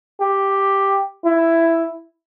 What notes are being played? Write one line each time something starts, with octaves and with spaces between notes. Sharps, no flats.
G4
E4